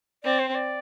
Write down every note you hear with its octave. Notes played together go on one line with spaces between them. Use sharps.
C4 D5
C5
C5
D5